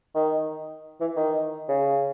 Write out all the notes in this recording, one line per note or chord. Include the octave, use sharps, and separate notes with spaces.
D#3
E3
D#3
C#3